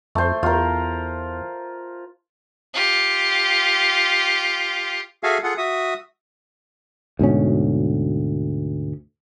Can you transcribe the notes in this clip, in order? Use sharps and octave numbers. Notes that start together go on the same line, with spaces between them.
F2 A3 C5
E2 F4 A#4
F4 G4
F#4 G#4 A4 E5 F5 G#5
F4 G#4 A4 F#5
F#4 E5 D#6
D2 G#2 B2 C#4